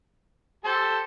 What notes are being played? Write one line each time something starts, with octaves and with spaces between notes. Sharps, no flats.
G4 A4 C5 A5